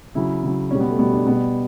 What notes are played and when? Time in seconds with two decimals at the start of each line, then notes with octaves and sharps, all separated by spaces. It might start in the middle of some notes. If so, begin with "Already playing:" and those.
0.15 C#3 F#3 E4
0.43 C#3 F#3
0.71 B2 G3 C#4
0.80 B3
0.90 A3
0.99 B2 G3 B3
1.13 D4
1.27 B2 G3 B3